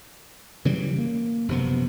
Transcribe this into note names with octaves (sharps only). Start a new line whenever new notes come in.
C#3 E3 F#3 G3
A#3
F#1 C3 F3 B3